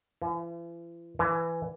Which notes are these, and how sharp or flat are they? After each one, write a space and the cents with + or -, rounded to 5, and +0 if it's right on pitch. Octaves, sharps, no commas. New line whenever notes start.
E3 +45
E3 +15